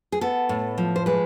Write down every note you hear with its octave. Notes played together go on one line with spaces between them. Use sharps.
G#4
B3 A4
A2
F3
C5
G#3 B4